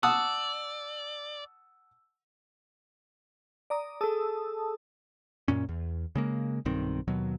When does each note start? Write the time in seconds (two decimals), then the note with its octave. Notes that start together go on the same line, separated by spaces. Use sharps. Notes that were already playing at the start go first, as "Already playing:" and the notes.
0.03 D5 F#5 A5 D#6 E6
3.70 D5 A#5 D#6
4.01 G#4 A4 A5 D#6 E6
5.48 F#2 A#2 C#4
5.69 E2
6.15 C#3 G#3 A#3
6.65 B1 G2 D#3 C4
7.08 D#2 B2 F#3